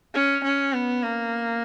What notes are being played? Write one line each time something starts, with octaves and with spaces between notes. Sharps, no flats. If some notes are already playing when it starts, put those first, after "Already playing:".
C#4
C#4
B3
A#3